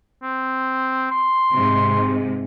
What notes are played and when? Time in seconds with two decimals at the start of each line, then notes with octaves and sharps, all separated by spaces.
0.23 C4
1.11 C6
1.52 G#2 C3